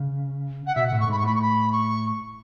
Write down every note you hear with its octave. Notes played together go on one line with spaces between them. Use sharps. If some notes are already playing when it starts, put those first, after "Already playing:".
Already playing: C#3
F#5
B2 E5
A2 F#5
C#6
G#2 B5
C#6
A2 B5
C#6
B5
C#6